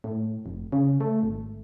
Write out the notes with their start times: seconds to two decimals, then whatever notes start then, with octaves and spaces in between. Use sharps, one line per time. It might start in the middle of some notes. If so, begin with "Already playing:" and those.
0.04 A2
0.46 F1
0.72 C#3
1.01 A3
1.23 G#1